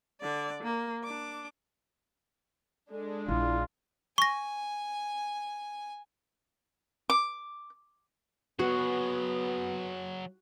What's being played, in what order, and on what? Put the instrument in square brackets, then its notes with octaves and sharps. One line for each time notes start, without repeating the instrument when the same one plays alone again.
[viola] D3 D5
A#3
D4 D6
[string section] G#3 D4 [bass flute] A4
[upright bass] A#1 [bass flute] E4 [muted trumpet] F4
[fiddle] G#5 [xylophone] C#6 A#6
[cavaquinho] D6
[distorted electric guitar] F#3 G#4 [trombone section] B3 [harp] F#4